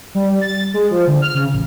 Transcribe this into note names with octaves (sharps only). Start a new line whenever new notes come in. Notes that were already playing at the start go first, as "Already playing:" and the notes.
G3
A6
G#3
F3
D3
F6
C#3
A1